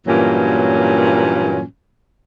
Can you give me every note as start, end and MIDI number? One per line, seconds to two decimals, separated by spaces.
0.07 1.62 43
0.07 1.62 46
0.07 1.62 52
0.07 1.62 54
0.07 1.62 58
0.07 1.62 61